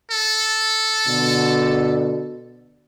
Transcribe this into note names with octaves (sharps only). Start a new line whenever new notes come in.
A4
B2 D3